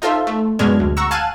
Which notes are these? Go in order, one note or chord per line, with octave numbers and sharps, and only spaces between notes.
D#4 F4 A4 C5 E5
A3
F#2 B2 G#3 D4 F6 G#6
D2
F#5 A#5 C#6 E6
F5 G#5 A5 F#6 D#7 E7